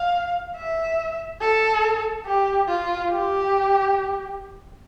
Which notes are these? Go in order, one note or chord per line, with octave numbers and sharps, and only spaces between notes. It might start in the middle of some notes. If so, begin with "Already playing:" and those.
Already playing: F5
E5
A4
G4
F4
G4